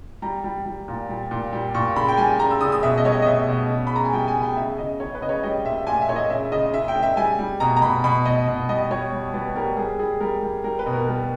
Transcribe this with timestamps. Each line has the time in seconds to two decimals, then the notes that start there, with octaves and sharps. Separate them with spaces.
0.22 G3 A#5
0.44 G3
0.66 G3
0.88 A#2
1.09 G3
1.31 A#2
1.53 G3
1.74 A#2 C#6
1.96 C#3 B5
2.08 G5
2.17 G3 G#5
2.39 C#3 A#5
2.51 E6
2.61 C#3 D#6
2.72 D#6
2.83 B2 E5
2.97 D#5
3.05 G3 C#5
3.12 D#5
3.22 D#5
3.26 B2 E5
3.48 B2
3.70 C#3
3.87 B5
3.91 C#3 A#5
4.04 G#5
4.13 G3 G5
4.28 G#5
4.35 C#3
4.42 G5
4.57 C#3 E5
4.78 C#3 D#5
5.00 C#3 C#5
5.15 B4
5.22 C#3 D#5
5.29 C#5
5.43 G3 D#5
5.65 A#2 E5
5.87 A#2 G#5
6.01 E5
6.08 A#2 C#5
6.16 D#5
6.30 C#3 E5
6.52 C#3 D#5
6.74 C#3 E5
6.88 G5
6.95 C#3
7.02 E5
7.17 G3 G#5
7.39 G3
7.60 B2 A#5
7.76 A#5
7.82 B2 B5
8.04 B2 B5
8.25 B2 D#5
8.47 B2
8.69 G3 D#5
8.91 G3 C#5
9.12 G3
9.34 G3 B4
9.56 G3 A#4
9.77 G3 G#4
9.99 G3 G#4
10.20 G3 A#4
10.42 G3
10.64 G3 A#4
10.79 B4
10.86 B2
10.93 A#4
11.07 G3 A#4